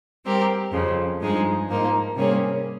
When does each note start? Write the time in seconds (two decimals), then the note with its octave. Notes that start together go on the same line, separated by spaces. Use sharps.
0.25 G3 C4 G4 A#4
0.72 F2 C#3 F3
1.20 G2 F3 G#3 D#4 G#4
1.68 G#2 F3 A#3 D#4
2.15 C3 G3 A#3 C#4 G#4